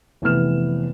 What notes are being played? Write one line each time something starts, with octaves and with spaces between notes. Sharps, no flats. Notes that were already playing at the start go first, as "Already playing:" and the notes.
F1 E3 B3 F6 E7